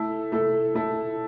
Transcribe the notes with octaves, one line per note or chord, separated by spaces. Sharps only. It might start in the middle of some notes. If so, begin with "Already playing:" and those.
Already playing: A3 E4 A4
A3 E4 A4
A3 E4 A4